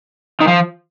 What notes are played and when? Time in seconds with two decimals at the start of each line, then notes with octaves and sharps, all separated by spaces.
0.41 D#3
0.48 F3